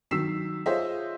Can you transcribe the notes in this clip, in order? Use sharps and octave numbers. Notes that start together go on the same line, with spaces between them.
D#3 F#3 E6 B6 C7 E7
F4 G#4 C5 C#5 D#5 E5